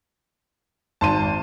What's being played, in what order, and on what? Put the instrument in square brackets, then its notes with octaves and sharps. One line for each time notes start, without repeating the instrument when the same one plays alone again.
[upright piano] G#1 [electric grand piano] A5 C6 D#7